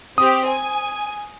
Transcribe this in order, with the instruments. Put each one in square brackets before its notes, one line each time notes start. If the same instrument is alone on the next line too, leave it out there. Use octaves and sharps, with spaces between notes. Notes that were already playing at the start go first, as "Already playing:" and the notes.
[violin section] C4 G4 [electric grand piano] D#6
[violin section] G#5